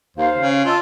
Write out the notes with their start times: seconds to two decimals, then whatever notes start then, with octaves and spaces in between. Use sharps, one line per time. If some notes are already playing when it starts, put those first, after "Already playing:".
0.17 D#2 C5 F5
0.36 C#3
0.65 F4 D#5 A5 E6